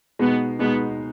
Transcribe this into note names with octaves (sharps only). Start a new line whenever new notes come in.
B2 G#3 B3 D#4
B2 G#3 B3 D#4